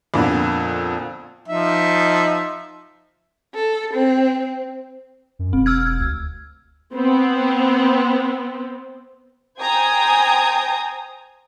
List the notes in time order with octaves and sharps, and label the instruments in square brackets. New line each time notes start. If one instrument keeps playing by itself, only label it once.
[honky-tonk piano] F2 A#2 D3 B3
[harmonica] F3 D#4 E5
[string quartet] A4
C4
[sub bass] F#2
[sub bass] E1 [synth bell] C4
[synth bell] E6 F6 G#6
[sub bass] D2
[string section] B3 C4
[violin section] C5 G5 G#5 A#5 D#6 G#6